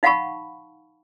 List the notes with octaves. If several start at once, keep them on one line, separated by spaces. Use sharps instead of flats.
D#4 F5 F#5 A5 B5 C#6